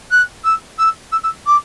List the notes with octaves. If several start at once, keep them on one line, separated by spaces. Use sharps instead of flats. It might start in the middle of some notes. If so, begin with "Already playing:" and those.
F#6
E6
E6
E6
E6
D6